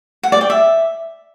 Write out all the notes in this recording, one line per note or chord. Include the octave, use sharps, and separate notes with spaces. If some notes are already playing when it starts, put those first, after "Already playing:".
F#5
D5
G5
E5